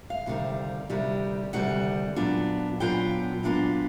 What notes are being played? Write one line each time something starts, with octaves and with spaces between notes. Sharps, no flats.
F5
D2 C3 D#3 G3
D2 C3 D#3 G3
D2 C3 D#3 G3 F#5
A#2 F#3 B3 D4 F4
A#2 F#3 B3 D4 F4 G5
A#2 F#3 B3 D4 F4